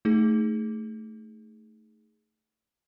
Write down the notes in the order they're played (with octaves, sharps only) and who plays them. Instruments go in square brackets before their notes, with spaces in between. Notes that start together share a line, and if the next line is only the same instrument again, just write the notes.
[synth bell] A3 D#4 G#4